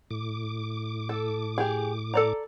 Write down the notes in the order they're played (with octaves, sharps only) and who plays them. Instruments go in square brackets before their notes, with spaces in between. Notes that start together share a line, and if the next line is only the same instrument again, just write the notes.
[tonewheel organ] A2 D6
[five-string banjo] A4
G4 G#4
A4 D5 A#5